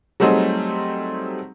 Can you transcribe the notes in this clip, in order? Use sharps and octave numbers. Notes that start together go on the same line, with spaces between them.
F#3 G3 A3 C4 D#4 G#4